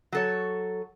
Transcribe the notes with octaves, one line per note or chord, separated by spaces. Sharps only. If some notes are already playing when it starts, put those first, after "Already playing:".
F#3 A4 C#5